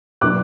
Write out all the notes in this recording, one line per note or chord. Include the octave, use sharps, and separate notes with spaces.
B2 F#3 B3 D4 D6 F#6